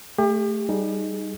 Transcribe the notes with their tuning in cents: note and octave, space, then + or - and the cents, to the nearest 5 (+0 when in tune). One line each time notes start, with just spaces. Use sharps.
A3 +0 G4 +40
G3 +0 D#4 +0 G#4 +15